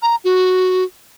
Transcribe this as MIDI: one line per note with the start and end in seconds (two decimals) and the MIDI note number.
0.02 0.16 82
0.24 0.84 66